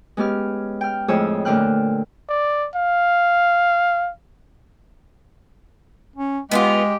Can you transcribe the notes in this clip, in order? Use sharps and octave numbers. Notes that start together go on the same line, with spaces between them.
G#3 B3 C#4 G4 F6
G5 F6
F2 A2 G#3 G#4 C#5 E6
A#2 D3 A3 G5 F6 F#6
D5
F5
C#4
G#3 B3 E4 F4 G4